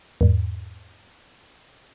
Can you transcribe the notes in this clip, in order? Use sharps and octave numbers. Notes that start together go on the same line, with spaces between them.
E2 G#2